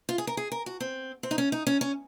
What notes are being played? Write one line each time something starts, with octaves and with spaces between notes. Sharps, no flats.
F4
G#4
A#4
G#4
A#4
F#4
C4
C4
D#4
C#4
D#4
C#4
C#4